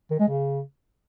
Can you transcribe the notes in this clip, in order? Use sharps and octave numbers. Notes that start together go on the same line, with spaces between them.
D#3
G#3
C#3